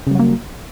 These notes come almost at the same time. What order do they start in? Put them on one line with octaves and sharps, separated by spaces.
C#3 G3 F#3 A#3